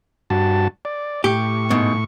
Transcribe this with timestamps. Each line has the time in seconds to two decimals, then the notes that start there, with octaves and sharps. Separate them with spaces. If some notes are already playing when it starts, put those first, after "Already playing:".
0.30 G2 F#4 A5
0.85 D5
1.24 A2 G4 C#6
1.70 G#2 B2